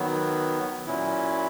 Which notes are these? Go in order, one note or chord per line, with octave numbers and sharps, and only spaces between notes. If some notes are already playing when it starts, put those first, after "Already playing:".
Already playing: D#3 F#3 B3
A#2 F#3 C#4 E4